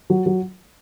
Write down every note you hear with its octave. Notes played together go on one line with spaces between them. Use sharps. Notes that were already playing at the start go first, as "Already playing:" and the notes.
F#3
F#3